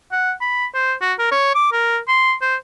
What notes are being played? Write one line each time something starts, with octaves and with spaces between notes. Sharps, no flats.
F#5
B5
C5
F#4
A#4
C#5
D6
A#4
C6
C5